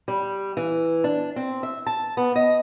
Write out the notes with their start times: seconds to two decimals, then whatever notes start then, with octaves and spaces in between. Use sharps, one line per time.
0.08 G3
0.57 E3
1.04 D4
1.36 C4
1.63 E5
1.87 A5
2.17 B3
2.36 D#5